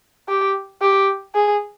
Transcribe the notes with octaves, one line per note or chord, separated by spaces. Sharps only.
G4
G4
G#4